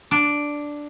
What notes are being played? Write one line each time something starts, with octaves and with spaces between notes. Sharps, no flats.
D4